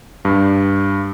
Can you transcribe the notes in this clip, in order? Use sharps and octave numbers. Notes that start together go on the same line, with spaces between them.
G2